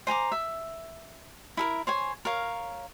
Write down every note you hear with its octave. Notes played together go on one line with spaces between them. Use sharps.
C5 G#5 A#5 D6
E5
E4 A4 A#4
C5 C#5 G#5
A#4 C#5 F5